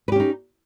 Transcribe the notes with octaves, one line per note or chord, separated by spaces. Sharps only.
C#4 D#4 G4 B4